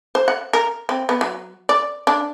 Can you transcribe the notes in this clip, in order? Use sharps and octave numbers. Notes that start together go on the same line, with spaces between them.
C5
F#5
A#4
C4
B3
F#3
D5
D4